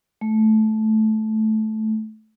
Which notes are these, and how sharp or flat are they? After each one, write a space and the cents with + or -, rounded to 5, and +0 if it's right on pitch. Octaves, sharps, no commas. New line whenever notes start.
A3 -15